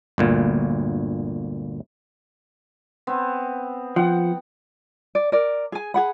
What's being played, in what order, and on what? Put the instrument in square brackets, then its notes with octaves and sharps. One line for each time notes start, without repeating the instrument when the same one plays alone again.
[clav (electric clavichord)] G1 D2 A#2
[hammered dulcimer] B3 C4
[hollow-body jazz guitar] F3 [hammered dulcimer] F#5 G5
[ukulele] D5
A#4 D5
G#4 G#5
G#4 F#5 B5